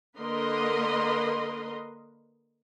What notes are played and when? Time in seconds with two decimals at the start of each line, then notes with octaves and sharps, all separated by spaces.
0.17 D3 A#3 A#4 B4 D#5 C6